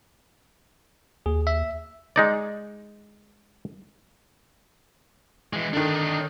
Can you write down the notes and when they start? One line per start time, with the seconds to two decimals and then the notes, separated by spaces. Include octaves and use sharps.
1.26 D#2 G#4
1.47 E5
2.16 G#3 D#4 D5
5.53 E3 G#3
5.73 D3 D#3 D4 D#4